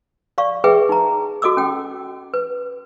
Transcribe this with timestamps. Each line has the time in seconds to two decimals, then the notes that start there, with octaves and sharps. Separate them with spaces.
0.38 D5 F5 C#6
0.64 G#4 B4 E5 G5
0.89 D#4 A#5
1.42 F#4 A4 D#5 D6 E6
1.57 C#4 G5
2.34 B4